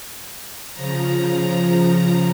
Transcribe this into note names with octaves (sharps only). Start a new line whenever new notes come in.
C#3 F3 A#5